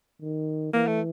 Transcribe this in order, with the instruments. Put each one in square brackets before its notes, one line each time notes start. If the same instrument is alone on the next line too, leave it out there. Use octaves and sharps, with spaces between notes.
[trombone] D#3
[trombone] E3 [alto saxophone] A#3
[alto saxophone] A3